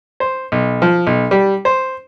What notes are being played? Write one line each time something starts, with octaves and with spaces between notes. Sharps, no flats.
C5
B1
F3
B1
G3
C5